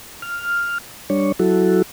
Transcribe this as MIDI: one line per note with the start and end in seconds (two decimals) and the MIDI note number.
0.22 0.78 89
1.10 1.32 55
1.10 1.32 62
1.10 1.32 73
1.39 1.82 54
1.39 1.82 64
1.39 1.82 66
1.39 1.82 69